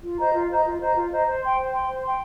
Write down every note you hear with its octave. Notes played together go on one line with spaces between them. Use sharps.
F4
C5 D#5 A#5
F4
C5 D#5 A#5
F4
C5 D#5 A#5
F4
C5 D#5 A#5
C5
G5 C6
C5
G5 C6
C5
G5 C6